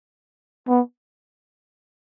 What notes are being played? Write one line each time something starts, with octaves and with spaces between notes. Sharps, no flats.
B3